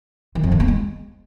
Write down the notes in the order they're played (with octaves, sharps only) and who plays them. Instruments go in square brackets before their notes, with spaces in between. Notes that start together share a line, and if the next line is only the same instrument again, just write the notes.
[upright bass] D#3
F2
D#3
A#3
G#3